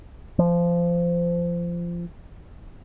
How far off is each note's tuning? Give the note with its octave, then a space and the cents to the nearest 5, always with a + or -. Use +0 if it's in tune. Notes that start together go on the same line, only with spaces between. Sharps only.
F3 -20